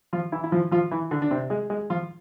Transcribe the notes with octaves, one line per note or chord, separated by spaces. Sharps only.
F3 F4
E3 E4
E4
F3 F4
F3 F4
E3 E4
D3 D4
D4
C3 C4
G#3 G#4
G#3 G#4
F3 F4